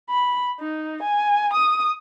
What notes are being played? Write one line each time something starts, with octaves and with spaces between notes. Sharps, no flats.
B5
D#4
G#5
D#6